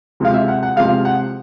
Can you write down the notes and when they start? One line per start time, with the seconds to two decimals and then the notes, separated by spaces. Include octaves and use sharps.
0.20 C3 F3 G#3 F5
0.34 E5
0.48 F#5
0.63 F#5
0.76 C3 F3 G#3 F5
1.05 F#5